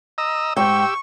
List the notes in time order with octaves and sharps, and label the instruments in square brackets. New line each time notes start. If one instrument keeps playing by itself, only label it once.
[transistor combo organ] D#5 A#5 E6
[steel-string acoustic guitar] G#2 G5 [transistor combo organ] G4 E6 [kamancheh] C#6